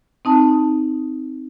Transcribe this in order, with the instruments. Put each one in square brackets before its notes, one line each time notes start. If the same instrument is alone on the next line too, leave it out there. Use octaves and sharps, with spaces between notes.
[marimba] C4 D#4 A5